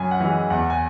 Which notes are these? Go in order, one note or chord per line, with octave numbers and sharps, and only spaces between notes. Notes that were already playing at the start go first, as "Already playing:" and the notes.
Already playing: F#2 G#5
F#5
E3 G#3
E2 F#5
G#5